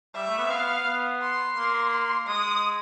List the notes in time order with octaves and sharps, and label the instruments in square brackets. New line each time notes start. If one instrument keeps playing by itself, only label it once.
[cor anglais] G3 [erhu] E5
[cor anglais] A3
B3
C4
[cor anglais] B3 [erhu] F5
[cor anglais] B3
[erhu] C6
[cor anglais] A#3
[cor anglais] G#3 [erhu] D#6